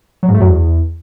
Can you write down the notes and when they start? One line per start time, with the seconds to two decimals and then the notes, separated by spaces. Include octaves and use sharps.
0.23 F#3
0.29 G#2
0.34 A3
0.40 F#2
0.46 E2